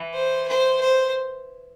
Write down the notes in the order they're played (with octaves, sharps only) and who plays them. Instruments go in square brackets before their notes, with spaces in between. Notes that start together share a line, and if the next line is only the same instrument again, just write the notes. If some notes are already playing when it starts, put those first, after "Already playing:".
Already playing: [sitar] E3
[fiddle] C5
C5
C5